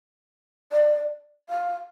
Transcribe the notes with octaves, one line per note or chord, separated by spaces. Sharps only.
D5
F5